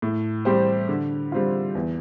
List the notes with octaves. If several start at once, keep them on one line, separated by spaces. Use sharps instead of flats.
A2
G3 C4 G4 C5
D3
G3 C4 F4
E2